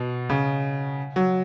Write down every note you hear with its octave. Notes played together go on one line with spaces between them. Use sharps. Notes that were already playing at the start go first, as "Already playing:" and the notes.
Already playing: B2
C#3
F#3